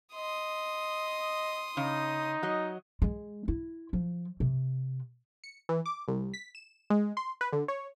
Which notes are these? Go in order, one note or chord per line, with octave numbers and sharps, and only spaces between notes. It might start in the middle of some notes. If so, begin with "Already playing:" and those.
D#5 C6 D#6
C#3 D#4
F#3 D#5
G#3
E4
F3
C3
C#7
E3
D6
C2
B6
E7
G#3
C6
B4
D3
C#5